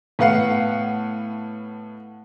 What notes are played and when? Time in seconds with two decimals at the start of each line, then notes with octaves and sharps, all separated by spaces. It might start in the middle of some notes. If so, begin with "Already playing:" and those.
0.19 A2 B3 F5 F#5 C7